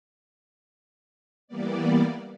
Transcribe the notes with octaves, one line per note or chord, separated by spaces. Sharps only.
E3 G3 A#3 B3 D5